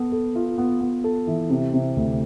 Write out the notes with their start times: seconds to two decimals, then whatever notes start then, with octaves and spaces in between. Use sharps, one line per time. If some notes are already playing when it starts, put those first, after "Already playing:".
Already playing: B3 A4
0.12 A4
0.36 F4
0.58 B3
0.81 B3
1.04 A4
1.27 E3
1.50 C3
1.73 C3
1.97 D2